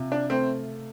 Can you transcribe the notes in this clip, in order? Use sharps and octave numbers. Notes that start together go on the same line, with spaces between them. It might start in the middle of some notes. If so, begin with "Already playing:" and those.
Already playing: C3 F4
D4
A3 C4